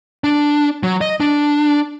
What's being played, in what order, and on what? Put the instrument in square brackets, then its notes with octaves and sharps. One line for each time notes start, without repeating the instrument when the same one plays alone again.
[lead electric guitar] D4
F#3
D#5
D4